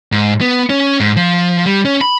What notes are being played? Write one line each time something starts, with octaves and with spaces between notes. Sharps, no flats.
G#2
B3
C#4
G#2
F3
G3
C#4
B5